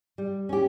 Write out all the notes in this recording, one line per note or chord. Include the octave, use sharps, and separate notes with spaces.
G3
C#4 G4